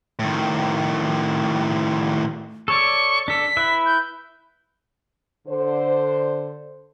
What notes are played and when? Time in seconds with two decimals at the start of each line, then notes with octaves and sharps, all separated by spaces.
0.19 A2 D#3
2.68 A4 C#5 D5 C#6
3.28 D4 A4 B6
3.57 E4 B4 E5
3.86 G6
5.47 D3 C5